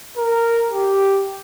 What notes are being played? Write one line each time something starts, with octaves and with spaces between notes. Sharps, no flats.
A#4
G4